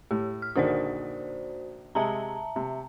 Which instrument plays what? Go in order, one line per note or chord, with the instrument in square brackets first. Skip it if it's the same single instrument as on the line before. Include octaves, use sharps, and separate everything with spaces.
[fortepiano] A2 [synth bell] G4
[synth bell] F6
[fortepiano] A#1 D3 D#3 [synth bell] F#4 C5 D5
[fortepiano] C3 G#3 [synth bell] E5 A5 A#5
[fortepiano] C3